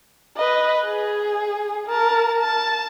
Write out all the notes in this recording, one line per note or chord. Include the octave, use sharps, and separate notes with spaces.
B4 D#5
G#4
A#4 A5
A5